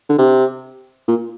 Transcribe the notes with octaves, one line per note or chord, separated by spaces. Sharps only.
D3
C3
A#2